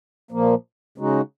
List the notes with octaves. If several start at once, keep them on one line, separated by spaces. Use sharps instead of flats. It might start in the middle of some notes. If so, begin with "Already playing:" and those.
A#2 F3 A#3
C#3 G#3 D#4 F#4